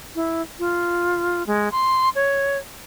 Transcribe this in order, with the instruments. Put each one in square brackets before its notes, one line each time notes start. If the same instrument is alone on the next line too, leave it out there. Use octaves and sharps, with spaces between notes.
[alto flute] E4
F4
G#3
C6
C#5